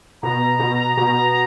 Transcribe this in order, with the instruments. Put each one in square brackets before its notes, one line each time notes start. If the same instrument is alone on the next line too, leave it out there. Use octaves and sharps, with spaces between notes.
[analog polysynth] B2 [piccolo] A#5
[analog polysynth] B2
B2